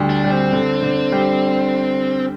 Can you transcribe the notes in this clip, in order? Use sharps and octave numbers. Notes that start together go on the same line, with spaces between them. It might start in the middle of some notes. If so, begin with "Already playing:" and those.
Already playing: D2 G3
D4
G3
C4
D3
D3
G3